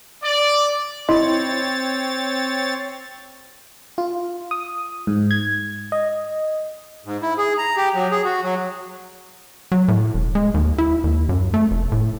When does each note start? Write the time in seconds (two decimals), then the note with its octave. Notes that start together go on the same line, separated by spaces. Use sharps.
0.23 D5
1.09 C4 E4 C#5 D#5 C6 A6
3.98 F4
4.51 D#6
5.07 G#2
5.31 G#6
5.92 D#5
7.05 G#2
7.22 E4
7.38 G#4
7.58 A#5
7.77 G4
7.94 F#3
8.11 G#4
8.25 F#4
8.43 F#3
9.72 F#3
9.88 A2
10.14 E1
10.35 G#3
10.54 D#2
10.78 E4
11.04 D#2
11.29 F#2
11.54 A3
11.71 F1
11.92 A2